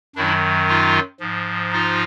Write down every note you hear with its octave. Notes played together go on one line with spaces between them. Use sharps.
F#2 D#3 F#3 D4 E4
D#4 F4
G#2 F3
D#4 F4